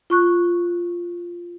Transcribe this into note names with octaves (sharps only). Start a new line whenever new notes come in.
F4 C#6 F#6